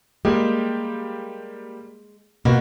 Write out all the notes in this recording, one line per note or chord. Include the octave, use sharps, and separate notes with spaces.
G3 G#3 A#3 G4
B2 A#3 F#4